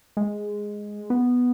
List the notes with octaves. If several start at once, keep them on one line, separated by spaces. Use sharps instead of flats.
G#3
B3